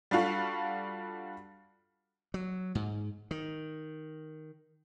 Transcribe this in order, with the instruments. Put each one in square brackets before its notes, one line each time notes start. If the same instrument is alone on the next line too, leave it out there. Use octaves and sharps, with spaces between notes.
[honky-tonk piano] G3 D4 F4 F#4 A4
[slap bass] F#3
G#2
D#3